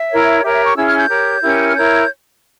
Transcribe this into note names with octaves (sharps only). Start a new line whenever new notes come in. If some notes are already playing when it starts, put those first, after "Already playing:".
Already playing: E5
E4 A#4 C#5
G4 A#4 C#5 E5
E5
C#6
C#4 E4 G#4 E6
F6
G6
G4 A#4 C#5
C#4 E4 G4 A#4
F6
E4 A#4 C#5 G6